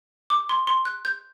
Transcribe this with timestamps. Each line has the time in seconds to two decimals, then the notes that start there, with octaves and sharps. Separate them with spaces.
0.30 D6
0.49 C6
0.67 C6
0.85 F#6
1.05 G6